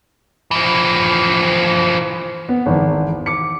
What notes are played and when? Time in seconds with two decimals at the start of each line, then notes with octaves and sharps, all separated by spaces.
0.51 E3 F3
2.49 B3
2.66 G#1 E2
3.26 D6 C#7